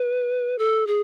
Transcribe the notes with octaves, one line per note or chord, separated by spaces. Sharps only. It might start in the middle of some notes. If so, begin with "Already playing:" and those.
Already playing: B4
A4
G#4